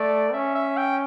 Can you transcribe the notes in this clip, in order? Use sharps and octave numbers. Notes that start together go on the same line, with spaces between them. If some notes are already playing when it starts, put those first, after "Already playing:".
Already playing: A3 D5
C#4 E5
E5
G5